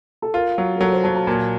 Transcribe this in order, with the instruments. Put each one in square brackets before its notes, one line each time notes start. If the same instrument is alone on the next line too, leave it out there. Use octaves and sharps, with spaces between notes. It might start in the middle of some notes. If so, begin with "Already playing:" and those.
[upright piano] A4
[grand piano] F4 [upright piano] A#4
[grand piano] F#3
[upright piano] A#4
[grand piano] F#3 [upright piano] A4
[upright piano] C5
[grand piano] F#3 [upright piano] A5
[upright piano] A5
[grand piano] A#2 [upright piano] A5